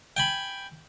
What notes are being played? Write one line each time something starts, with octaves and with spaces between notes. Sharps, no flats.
G5 G#5 B5